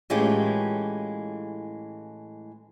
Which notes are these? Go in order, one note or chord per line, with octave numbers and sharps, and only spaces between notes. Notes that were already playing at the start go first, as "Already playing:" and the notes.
A2 E3 G#3 C#4 F4 G4